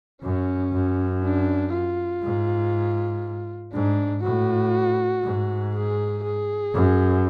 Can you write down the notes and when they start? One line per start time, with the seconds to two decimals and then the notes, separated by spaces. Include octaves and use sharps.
0.22 F#2 C#4
0.73 F#2
1.23 D4
1.73 F4
2.23 G#2
3.73 G#2 D4
4.23 A2 F#4
5.23 G#2
5.74 G#4
6.24 G#4
6.74 F#2